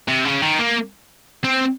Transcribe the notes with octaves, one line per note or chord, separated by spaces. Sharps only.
C3
C#3
D#3
A#3
C4